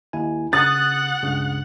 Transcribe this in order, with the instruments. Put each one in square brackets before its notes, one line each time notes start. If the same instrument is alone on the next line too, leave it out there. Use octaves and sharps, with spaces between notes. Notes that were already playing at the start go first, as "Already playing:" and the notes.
[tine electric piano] D#2 E4 G#5
[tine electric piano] C#3 [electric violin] F#5 F#6 [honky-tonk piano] D#6 A6
[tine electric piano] C#2 G2 C#3